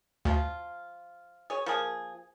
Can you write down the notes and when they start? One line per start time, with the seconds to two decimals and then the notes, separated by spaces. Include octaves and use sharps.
0.25 D2 F3 F4
1.50 G#4 C#5
1.66 F3 A#3 G#4